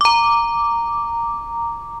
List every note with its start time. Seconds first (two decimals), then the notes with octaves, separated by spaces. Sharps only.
0.01 A#5 D6